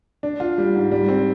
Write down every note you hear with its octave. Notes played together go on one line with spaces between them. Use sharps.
D4
F4
G3
G#2
G3
C4